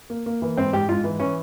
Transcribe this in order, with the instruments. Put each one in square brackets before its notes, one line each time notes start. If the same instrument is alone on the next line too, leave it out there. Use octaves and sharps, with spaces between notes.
[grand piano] A#3
A#3
E3
[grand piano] G#2 [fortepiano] C4
[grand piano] G#2 [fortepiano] G4
[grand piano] G#2 [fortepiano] F4
[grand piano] E3
[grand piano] E3 [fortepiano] C#4